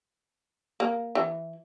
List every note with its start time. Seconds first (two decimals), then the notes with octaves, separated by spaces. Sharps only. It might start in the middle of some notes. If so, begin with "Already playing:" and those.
0.80 A#3
1.15 E3